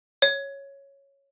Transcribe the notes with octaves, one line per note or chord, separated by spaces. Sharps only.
C#5